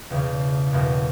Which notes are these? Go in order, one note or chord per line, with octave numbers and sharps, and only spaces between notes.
E1 E2 C#3
F#1 E2 B2